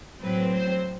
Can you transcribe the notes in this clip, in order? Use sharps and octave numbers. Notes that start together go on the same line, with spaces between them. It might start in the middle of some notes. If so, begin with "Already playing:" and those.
A2 F#3 C4 B4
C5